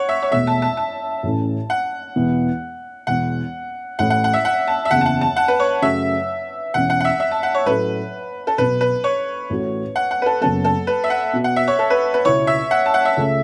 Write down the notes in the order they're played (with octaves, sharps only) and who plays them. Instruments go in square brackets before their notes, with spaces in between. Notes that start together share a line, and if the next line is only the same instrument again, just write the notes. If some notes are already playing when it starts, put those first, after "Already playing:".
Already playing: [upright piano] C#5 F#5
E5
C#5
[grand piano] E1 E2 B2 A3 [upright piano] E5
[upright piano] A5
A5
A5
[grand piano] A1 A2 A3 C#4
[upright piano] F#5
[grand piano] E1 E2 E3 B3 E4
[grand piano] E1 E2 E3 [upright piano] F#5
[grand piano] A1 A2 A3 E4 [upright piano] F#5
[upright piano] F#5
F#5
E5
F#5
A5
E5
[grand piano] F#1 E2 C#3 [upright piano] F#5
[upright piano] A5
F#5
A5
F#5
B4
C#5
[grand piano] F#2 C#3 F#3 A3 [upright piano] E5
[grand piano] E1 E2 E3 C#4 [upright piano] F#5
[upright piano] F#5
F#5
E5
E5
A5
F#5
C#5
[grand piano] A2 F#3 C#4 A4 [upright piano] B4
[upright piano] A4
[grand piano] B1 B2 F#3 B3 [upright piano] B4
[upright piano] B4
C#5
[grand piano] A1 A2 A3 F#4
[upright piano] F#5
F#5
B4
A4
[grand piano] F#1 F#2 F#3 B3 [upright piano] A4
[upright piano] A4
B4
E5
F#5
[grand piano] B2 B3 F#4
[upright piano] F#5
E5
C#5
A4
B4
B4
[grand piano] C#2 B2 B3 E4 B4 [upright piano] C#5
[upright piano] E5
F#5
A5
F#5
E5
[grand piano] C#2 C#3 A3 C#4